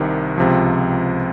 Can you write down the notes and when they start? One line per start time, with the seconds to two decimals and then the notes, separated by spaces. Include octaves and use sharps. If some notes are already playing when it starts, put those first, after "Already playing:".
Already playing: C2 C3 D#3
0.38 C#2 C3 F3